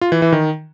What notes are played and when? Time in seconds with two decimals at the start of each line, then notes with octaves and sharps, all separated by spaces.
0.01 F4
0.12 E3
0.22 E3
0.32 D#3